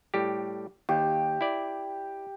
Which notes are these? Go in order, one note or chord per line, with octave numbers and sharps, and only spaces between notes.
A2 G3 G4
D#2 G4
E4 D5